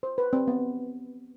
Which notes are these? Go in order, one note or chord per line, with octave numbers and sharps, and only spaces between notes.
C5
B4
C4
B3